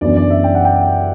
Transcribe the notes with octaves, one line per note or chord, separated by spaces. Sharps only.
F#2 C#3 E3 B3 D4 D5
D5
E5
G5
F#5
G5